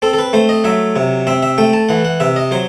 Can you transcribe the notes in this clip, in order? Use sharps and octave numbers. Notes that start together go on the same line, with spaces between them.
C4 A4
A4
B4
A3 C5
D#5
F#3 E5
C3
C4 E5
E5
A3 G5
A5
E3 F#5
F#5
C3 E5
D#5
F#3 C5